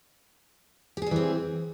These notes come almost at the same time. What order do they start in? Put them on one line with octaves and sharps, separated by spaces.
G4 G#4 G3 E3 C4